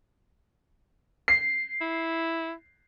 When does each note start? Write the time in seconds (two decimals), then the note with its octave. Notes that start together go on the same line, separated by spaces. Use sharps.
1.28 C7
1.81 E4